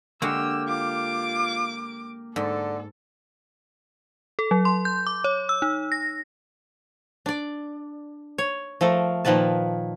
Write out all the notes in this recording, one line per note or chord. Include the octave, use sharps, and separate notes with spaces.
D3 G#3 A#3 F#4 G4 E6
F4 D6
G#2 D3 A4
A4
F#3
C6
G6
D6
C#5
E6
D#4
A#6
D4 D5
C#5
F3 A3 A4 A#4
A#2 D#3 F3 B4 A5